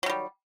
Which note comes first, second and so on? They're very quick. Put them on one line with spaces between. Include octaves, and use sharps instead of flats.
F#3 D#3 G3